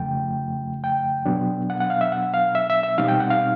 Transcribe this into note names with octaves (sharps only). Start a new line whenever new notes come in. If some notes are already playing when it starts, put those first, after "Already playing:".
Already playing: F2 C#3 F3 A3 G5
G5
B2 F#3 B3 D4
F#5
F#5
F5
E5
F#5
F5
E5
E5
E5
B2 G3 C4 D#4 F5
G5
F#5
F5